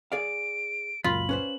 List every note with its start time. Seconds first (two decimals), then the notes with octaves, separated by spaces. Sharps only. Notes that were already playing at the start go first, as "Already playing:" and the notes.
0.12 G#4 D5 F5 D7
1.04 C#2 F#2 A#2 F4 B5 F#7
1.29 C#4 B4 C5